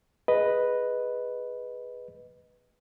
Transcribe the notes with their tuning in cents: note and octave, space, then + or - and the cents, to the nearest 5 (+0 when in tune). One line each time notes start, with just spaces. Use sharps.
G#4 +0 B4 +0 D#5 +0